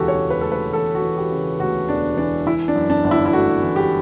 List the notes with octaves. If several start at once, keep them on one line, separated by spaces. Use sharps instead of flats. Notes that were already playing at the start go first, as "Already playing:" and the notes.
Already playing: E1 D2 C#3 E3 F#4 G4 A4
C#5
C#3
B4
D2 A4
B4
E1 A4
F#4
E3
G4
C#3
D2 F#4
E1 D4
E3 D4
E3 E4
D4
F#2
D4
G1
E4
E4
A3 F#4
E3
G4